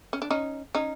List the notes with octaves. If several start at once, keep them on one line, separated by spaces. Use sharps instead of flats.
C#4
D4
C#4 D#4
C#4 D#4